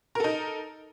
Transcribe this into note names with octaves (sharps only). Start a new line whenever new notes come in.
D#4 A4 A#4